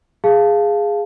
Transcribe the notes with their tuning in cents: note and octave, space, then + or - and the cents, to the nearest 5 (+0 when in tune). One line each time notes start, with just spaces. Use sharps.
G#4 -5 F5 -5 A5 +0